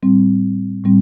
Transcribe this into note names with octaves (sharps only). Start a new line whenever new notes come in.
A2 G3 C4
A2 G3 C4